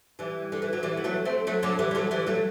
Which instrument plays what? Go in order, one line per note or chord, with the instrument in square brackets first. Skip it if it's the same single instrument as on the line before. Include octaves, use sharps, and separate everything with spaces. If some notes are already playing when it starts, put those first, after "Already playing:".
[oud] E3 G3
D3
E3
F#3
E3 G3
B3
F#3 A3
A3 C4
F#3 A3
D3 F#3
E3 G3
G3
D3 F#3
E3 G3
F#3 A3